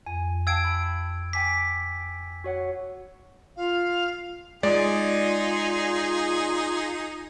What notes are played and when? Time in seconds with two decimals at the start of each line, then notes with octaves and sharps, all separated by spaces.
0.06 F2 G#5
0.47 F5 G5 A5 E6 G#6 D7
0.64 B5
1.33 G5 G#5 D6 B6
2.44 F#4 C#5 F#5
3.57 F4 F5
4.63 G#3 D#4 F4 G#4 D5